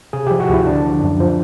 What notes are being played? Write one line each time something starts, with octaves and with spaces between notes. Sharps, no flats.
C3 G#4
F3 G4
F#4
D2 E4
D3 D4
F3
F#2
F3